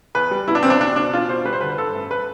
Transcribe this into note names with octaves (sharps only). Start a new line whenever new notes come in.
E2 B4
G3
B2 E4
D4
E2 C4
D4
B2 D4
B2 D4
B2 F4
B2 C5
G3 B4
C5
D3 B4
G2 A4
A1
B4